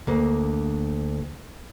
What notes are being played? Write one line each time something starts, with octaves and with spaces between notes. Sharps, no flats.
D2 A#3